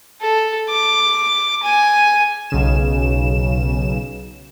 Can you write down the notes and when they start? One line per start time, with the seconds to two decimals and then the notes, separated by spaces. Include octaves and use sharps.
0.21 A4
0.70 D6
1.63 G#5
2.50 B1 C#3 E7